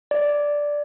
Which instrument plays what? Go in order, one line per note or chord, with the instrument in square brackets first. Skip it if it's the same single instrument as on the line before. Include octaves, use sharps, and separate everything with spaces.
[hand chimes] D5